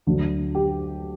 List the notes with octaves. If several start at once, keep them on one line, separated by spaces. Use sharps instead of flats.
D2 D3 F#3
G4